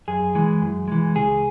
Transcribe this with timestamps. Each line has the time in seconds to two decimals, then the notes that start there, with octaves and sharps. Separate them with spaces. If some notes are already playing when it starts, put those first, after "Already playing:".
0.08 F#2 G#4
0.35 E3 G#3
0.62 F#2
0.88 E3 G#3
1.15 C#2 G#4